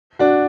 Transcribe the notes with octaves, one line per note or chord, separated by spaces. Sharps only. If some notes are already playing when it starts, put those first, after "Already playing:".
D4 F#4